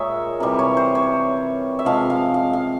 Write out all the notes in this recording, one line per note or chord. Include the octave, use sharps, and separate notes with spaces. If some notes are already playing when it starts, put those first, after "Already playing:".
Already playing: A#2 G#3 G#4 A#4 C#5 E5
C3 E3 G3
C#5
C5
C#5
E5
C3 F3 G#3 F5
F5
F5
F5